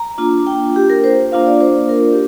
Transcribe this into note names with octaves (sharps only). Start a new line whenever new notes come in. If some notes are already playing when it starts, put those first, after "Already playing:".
Already playing: A#5
A#3 D4 F4
G5
G4
A#4
C5
A#3 D4 F4 F5
D5
C5
A#4
G4